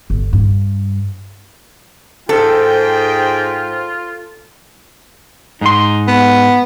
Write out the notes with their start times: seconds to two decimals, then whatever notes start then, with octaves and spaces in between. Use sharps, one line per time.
0.10 G1
0.33 G2
2.29 G#2 F4 A4 C5 G5 C6
5.61 G#2 D#4 C6
6.08 B3